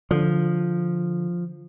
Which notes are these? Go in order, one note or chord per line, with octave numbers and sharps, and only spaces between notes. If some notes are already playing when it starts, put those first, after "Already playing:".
D3 F3